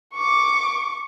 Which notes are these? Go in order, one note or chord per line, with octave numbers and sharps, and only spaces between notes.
C#6 D6